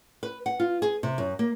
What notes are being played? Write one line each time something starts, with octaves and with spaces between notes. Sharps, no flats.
B4
F#5
F4
G#4
C3
F#2
A#3